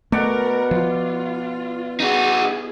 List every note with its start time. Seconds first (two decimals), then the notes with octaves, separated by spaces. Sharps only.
0.12 B2 A3 A#4 D5 F#5
0.71 F3 F4
2.00 D#4 E4 F#4 G#4